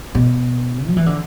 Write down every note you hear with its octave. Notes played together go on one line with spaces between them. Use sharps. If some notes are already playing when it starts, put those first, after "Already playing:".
B2
F#3
E3
D3